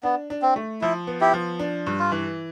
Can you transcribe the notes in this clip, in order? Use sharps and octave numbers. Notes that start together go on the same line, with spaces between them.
B3 D4
D4
C4
A3
F3 E4
B3
E4 G4
F3
D4
G2
F4
E3